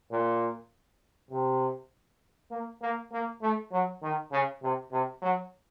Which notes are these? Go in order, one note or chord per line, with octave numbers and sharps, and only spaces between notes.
A#2
C3
A#3
A#3
A#3
A3
F#3
D#3
C#3
C3
C3
F#3